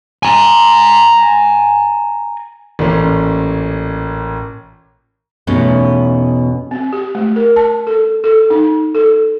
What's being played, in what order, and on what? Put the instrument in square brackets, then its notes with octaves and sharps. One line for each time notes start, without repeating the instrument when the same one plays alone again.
[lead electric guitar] G#5 A#5
[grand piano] A1 A#2 C#4
[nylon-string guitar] E2 B2 A3 C#4 D#4
[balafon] C4
G4
A3
A#4
A5
A4
A4
D#4
A4